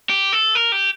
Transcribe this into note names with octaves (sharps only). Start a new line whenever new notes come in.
G4
A4
A#4
G4